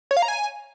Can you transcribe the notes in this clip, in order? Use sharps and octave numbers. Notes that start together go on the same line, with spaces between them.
C#5
F5
A#5
G#5